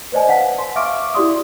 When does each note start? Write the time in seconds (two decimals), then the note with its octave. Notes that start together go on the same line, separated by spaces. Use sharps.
0.12 B4 C5 D5 D#5 G#5 A5
0.27 B4 F5 F#5 A5 B6
0.58 C6
0.76 E5 F5 C#6 D6 F6 D7
1.14 E4 F#4 G4 D5 C6 D#6